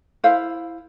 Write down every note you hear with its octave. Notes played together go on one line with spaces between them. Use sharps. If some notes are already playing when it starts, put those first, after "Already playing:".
E4 C5 F5